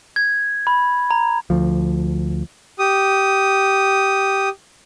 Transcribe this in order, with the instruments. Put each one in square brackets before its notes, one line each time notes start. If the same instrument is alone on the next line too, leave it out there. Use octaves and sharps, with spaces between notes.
[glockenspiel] G#6
B5
A#5
[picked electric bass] D2 F3
[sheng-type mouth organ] G4 D#6